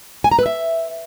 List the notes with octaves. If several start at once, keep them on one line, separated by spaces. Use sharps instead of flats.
G#5
A#5
B4
E5